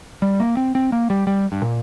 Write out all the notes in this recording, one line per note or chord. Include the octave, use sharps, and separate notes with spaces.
G3
A#3
C4
C4
A#3
G3
G3
G2
A#2